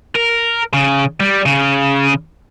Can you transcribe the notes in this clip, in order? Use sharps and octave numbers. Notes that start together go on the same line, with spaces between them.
A#4
C#3
G3
C#3